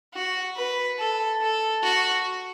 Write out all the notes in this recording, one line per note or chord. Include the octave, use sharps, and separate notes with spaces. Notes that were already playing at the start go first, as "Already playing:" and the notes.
F#4
B4
A4
A4
F#4